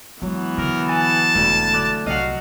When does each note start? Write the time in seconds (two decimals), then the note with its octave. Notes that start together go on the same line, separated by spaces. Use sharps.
0.22 E3 F#3 G#3 B3 E4
0.58 D3 A#4
0.89 G#5 A5
1.35 E1 D2
1.73 D3 D6 F#6
2.06 C2 F#3 F#4 D#5 F5 F#5